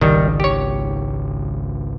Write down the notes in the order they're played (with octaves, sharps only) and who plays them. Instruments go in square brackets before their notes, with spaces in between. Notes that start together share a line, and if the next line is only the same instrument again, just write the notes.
[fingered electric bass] G#1 C#2 [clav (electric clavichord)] D#3 G3
[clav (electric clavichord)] G4 C#5